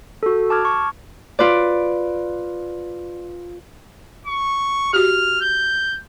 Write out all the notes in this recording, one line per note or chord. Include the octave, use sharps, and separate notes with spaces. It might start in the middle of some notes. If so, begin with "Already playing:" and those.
F#4 A4
A5 D6 F6 G#6
C#6
F4 B4 D5
C#6
F#4 G4 F6
G6